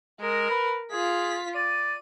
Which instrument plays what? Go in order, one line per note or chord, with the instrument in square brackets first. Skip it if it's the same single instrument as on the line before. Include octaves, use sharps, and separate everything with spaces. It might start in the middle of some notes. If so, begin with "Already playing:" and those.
[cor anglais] G#3 [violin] A#4
[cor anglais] B4
[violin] F4 B6 [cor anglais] G#4
[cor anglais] D5 [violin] D#7